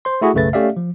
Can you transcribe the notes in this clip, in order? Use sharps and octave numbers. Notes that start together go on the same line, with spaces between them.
C5 C6
A3 E4 F#4 G#4
B1 F#2 C#3 A3 B4 A6
A3 C#4 G4 D5 E5 F5
F3